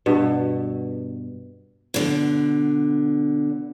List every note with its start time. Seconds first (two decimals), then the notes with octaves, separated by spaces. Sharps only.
0.06 G2 B2
1.94 B2 D3